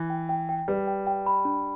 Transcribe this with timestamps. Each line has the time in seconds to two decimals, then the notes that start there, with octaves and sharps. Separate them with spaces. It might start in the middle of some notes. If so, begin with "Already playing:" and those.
Already playing: E3
0.10 G5
0.29 G5
0.49 G5
0.68 G3 B4
0.87 G5
1.07 G5
1.26 B5
1.45 D4